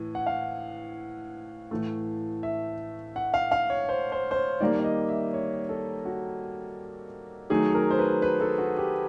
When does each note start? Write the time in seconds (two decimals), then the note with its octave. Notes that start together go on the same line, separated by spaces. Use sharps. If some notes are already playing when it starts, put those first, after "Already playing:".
Already playing: A2 E3
0.15 F#5
0.27 F5
1.71 A2 E3 A3
2.43 E5
3.16 F#5
3.34 F5
3.52 F5
3.70 C#5
3.89 C5
4.12 C5
4.31 C5
4.36 C#5
4.60 D#3 G3 A#3 D5
4.79 D5
4.84 D#5
5.09 E5
5.33 C#5
5.69 A4
6.05 F#4
7.50 D#3 F#3 A3 G#4
7.75 A#4
7.90 C5
7.99 B4
8.22 B4
8.41 A4
8.58 F#4
8.77 G4